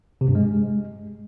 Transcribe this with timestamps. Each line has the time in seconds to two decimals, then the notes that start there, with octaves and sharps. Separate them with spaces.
0.21 C3
0.28 G2
0.35 G#3